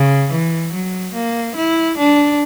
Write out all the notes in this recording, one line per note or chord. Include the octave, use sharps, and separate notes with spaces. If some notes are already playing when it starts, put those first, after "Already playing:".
Already playing: C#3
E3
F#3
A#3
E4
D4